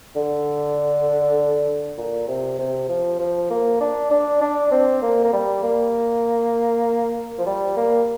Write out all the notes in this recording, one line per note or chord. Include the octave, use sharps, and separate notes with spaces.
D3
A#2
C3
C3
F3
F3
A#3
D4
D4
D4
C4
A#3
A#3
G3
A#3
F3
G3
A#3